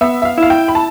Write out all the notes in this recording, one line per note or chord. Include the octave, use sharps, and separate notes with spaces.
B3 E5
E5
F5
E4 F5
G5
B5
A5